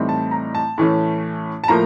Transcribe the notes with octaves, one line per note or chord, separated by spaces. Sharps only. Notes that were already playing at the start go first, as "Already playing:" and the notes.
Already playing: A2 E3 G3 C4 D#4
A5
A#5
A5
A2 E3 A3 C#4
A5
A2 F3 A#3 A#5